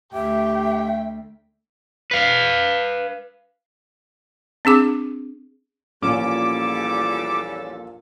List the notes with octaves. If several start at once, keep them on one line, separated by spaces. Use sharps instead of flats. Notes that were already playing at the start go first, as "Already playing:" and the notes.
D2 G4 E5 G5
B4 F5
C4 D4 G#4 D6
A#1 E2 A#2 G3 C#4 A4 D6